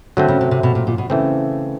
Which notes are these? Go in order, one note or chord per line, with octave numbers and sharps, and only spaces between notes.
D3 F#3 A3 C4
C#3
C3
C3
B2
A#2
A#2
B2
C#3 E3 A3 C4